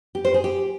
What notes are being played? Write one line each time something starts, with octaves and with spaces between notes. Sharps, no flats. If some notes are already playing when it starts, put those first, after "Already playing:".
G4
C5
G#4
G4